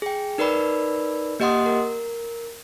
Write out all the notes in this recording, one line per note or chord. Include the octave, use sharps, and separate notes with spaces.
G#4 G5
D#4 A#4 B4 D5 B5 E6
A#3 G4 D#5 F#5 C6 D#6
A#4